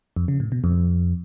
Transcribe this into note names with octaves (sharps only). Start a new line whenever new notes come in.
F2
C#3
A2
B2
F2